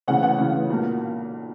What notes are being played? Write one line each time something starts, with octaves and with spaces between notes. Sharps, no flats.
D2 C#3 E3 B3 F#5
F#5
D2 C#3 E3 B3 F#5
B1 A#2 A#3